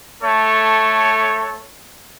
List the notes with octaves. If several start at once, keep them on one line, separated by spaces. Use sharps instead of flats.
A3 A4 C#5